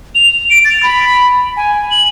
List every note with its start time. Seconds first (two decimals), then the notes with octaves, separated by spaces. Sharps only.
0.15 F7
0.50 D7
0.65 A6
0.83 B5
1.57 G#5
1.91 F#7